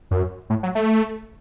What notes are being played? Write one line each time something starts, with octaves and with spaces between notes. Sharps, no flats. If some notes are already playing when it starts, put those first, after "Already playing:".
F#2
A2
F#3
A3